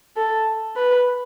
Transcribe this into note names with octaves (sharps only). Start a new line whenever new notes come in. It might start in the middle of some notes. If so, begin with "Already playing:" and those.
A4
B4